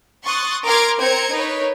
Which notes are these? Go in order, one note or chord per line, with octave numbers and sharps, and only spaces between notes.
C6 C#6 D#6 F#6 A6
A#4 C6 D6 F6 G#6 D7
C4 A#4 C5 A#5 G#6 C#7
D#4 A#4 B4 C#5